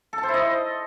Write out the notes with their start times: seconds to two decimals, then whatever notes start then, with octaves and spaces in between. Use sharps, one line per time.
0.13 A4
0.18 A5
0.23 C5
0.28 E4
0.34 D#5